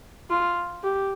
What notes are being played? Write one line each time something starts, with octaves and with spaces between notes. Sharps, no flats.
F4
G4